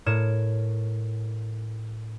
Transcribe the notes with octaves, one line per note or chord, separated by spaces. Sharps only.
A2 A#4 C#5 E7